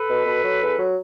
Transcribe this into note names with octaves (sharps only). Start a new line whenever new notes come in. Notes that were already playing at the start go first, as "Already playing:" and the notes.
Already playing: A4 B4
B2
B2
F#3
E2
F#3